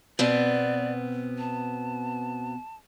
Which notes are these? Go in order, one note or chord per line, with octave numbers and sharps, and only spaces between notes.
B2 B3 C4 D5
A5